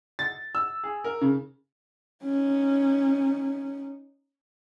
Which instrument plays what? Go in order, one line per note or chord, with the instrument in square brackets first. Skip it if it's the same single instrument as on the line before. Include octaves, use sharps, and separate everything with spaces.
[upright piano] A6
E6
G#4
A#4
C#3
[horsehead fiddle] C#4 D#4